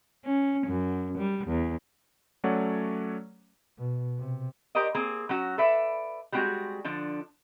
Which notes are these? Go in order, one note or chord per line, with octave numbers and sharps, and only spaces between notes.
C#4
F#2
G3
E2
F#3 A3 C#4 C#5 D5 F#5
B2
C3
G4 A#4 C5 D5 D#5
A#3 C4 G#4
F#3 C#4 F#4
A4 B4 D5 E5
G3 G#3 C4 F#4 G#4
D3 F3 D4